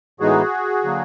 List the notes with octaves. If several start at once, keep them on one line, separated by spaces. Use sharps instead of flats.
A2 E3 G#3 B3 D#4 F#4 G#4
D3 F#3 A#3